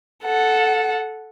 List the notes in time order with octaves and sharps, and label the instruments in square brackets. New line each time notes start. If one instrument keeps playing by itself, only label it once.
[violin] A4 F#5